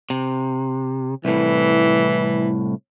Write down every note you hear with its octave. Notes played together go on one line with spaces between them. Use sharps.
C3
C2 A2 E3